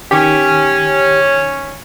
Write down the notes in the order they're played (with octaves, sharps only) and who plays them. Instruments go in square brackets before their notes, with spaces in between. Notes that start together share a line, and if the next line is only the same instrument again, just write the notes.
[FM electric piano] D#3 B6 [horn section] C#4 [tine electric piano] G4